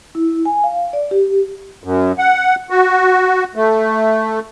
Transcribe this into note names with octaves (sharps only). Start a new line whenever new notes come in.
E4
G#5
F5
D5
G4
F#2
F#5
F#4
A3